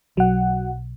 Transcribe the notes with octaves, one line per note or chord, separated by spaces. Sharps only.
B1 F#3 F#5